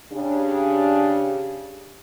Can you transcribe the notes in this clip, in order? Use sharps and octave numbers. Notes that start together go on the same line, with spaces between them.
C#3 D4 G4